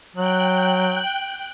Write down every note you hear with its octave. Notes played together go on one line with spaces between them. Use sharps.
F#3 G5 F#6